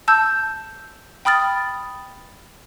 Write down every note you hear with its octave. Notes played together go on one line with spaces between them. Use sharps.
A5 E6 G6
G5 B5 D#6 F6 A6